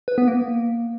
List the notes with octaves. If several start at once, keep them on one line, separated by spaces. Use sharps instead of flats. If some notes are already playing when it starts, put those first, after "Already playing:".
B4
B3
A#3